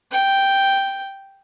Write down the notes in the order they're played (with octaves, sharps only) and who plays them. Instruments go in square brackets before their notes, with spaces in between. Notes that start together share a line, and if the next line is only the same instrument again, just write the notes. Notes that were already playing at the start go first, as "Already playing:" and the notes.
[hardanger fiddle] G5